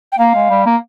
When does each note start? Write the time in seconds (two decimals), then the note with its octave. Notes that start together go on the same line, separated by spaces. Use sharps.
0.12 G5
0.18 A#3 F5
0.35 G#3
0.50 G3
0.66 A#3